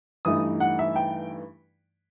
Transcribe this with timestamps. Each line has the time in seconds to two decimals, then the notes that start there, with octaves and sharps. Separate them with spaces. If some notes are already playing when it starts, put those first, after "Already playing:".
0.25 G2 E3 A3 D#4 D#6
0.60 F#5
0.79 E5
0.96 G5